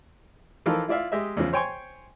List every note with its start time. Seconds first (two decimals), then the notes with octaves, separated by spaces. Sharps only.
0.66 E3 F3 D#4 F4 A4 A#4
0.88 E4 F4 D5 E5 F5
1.12 G#3 G4 D#5 E5
1.37 E2 C#3 F3
1.53 C5 C#5 G5 G#5 C6 C#6